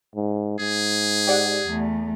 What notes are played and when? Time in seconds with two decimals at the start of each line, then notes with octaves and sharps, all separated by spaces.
0.16 G#2
0.59 G#2 G#4
1.27 G4 D5 F#5
1.66 E2 A3